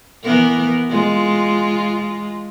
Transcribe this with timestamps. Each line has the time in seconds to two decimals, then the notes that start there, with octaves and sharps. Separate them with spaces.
0.23 E3 B3 A#4
0.90 G#3 F4